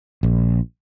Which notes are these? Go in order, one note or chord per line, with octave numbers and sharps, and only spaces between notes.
A#1